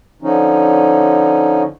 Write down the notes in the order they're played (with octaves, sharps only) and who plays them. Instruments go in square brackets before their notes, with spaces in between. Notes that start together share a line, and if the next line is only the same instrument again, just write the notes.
[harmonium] D3 F3 C#4 D#4